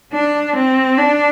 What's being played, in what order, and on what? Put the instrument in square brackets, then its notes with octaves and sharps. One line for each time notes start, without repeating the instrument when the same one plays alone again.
[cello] D4
C4
D4